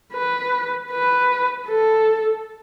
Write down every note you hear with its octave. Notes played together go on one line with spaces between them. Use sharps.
B4
B4
A4